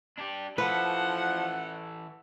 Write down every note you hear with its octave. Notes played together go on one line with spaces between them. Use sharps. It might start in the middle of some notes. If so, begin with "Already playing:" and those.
D4 G4
E3 F3 A4 B4 F#5